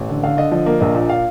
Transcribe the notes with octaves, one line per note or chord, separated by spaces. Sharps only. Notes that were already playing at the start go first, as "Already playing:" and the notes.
Already playing: A1
D3
D3 F5
D3 D#5
F3 D#5
A#3
A#1 D#5
A#2
F5